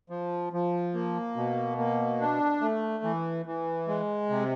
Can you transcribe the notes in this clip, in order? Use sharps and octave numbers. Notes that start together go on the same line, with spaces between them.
F3
F3
A#3
B2
A#3
D4
A3
E3
E3
G#3
C3